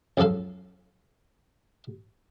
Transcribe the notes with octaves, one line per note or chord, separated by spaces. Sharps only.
C#2 F#2 F3 A4 F5